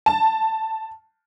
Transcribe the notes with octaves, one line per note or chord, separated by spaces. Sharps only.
A5